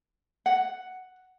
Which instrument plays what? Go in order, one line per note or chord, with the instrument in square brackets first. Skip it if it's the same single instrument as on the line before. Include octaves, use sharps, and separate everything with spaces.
[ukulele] F#5